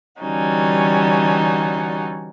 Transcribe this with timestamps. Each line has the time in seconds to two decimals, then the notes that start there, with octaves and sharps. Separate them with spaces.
0.21 D3 E3 G3 C#4 D#4 F#4